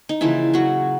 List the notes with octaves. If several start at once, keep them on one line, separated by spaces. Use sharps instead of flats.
D#4
C#3 E3 F3 A#3 E4
F#3 F#4